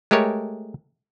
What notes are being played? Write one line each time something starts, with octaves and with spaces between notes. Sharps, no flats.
G#3 A3 G4 A#4 C#5